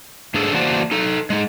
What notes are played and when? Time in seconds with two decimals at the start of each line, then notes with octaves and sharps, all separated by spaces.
0.34 G#2 D4 G#4 A4
0.54 E3 A#3 F#4 C5 D5 A5
0.91 D#4 A4
1.30 G#3 D#4